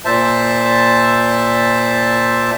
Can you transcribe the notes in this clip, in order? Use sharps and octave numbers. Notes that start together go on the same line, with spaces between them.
A#2 C5 E5 A5